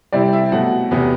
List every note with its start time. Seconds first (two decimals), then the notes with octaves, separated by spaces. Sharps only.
0.12 C3 G3 C4 E4 D5
0.33 E5
0.52 B2 F#3 A3 F#5
0.91 E2 C3 F#3 B3